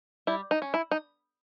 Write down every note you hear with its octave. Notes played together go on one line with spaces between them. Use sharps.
G3 E4
D#4
C#4
E4
D#4